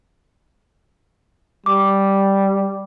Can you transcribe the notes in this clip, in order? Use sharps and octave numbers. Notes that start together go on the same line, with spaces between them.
G3 D6